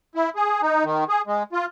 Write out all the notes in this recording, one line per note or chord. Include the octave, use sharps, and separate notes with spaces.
E4
G#4
D#4
D#3
G#4
G#3
F4